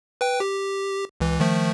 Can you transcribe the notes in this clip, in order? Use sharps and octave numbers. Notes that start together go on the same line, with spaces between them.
B4 G5
G4
C#2 E3
D#3 F3 A3